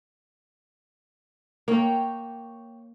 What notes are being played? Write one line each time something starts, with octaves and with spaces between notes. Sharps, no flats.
A#3 C#5 G5